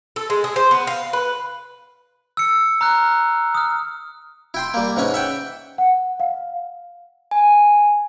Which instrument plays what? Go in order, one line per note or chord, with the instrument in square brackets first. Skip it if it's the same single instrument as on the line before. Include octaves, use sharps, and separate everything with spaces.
[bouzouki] A4
G#3
G#4
C5
B3
F5
B4
[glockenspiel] E6 C#7
A#5 F6 F#6
D#6 F6
[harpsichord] E4 G5 C6
G3 A#3
G#2 E3 C#4 G#5
E5 F#5 G5
[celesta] F#5
F5
[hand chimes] G#5